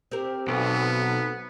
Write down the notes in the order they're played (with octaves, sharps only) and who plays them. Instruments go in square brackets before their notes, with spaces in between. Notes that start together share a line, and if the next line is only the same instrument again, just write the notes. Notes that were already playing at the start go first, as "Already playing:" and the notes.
[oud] C4 A#4 [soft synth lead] G4
[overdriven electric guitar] B1 [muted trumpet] B3 [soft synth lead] A4